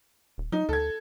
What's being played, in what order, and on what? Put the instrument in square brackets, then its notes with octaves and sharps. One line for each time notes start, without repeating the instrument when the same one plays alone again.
[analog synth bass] D#1
[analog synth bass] F#3 [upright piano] D#4
[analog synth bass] D2 [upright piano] A4 G#6